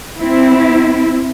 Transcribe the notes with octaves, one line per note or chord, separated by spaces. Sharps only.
C4 E4